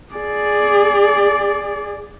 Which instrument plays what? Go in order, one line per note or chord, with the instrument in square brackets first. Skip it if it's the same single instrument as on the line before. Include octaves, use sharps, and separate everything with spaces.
[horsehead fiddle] G#4 D5